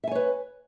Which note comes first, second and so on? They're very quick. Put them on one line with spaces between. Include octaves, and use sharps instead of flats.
E5 G#5 C#5 B4